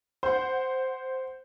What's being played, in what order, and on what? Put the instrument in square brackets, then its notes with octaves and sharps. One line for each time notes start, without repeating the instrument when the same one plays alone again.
[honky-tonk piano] C5 F#5